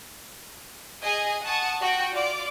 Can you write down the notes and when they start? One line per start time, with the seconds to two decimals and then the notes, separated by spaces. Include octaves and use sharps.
1.01 G#4 D#5 G#5
1.44 F#5 A5 C#6 D#6
1.81 F#4 G5
2.13 F4 D5 D6